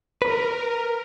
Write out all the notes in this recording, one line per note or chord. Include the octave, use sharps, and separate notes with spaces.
A#4 B4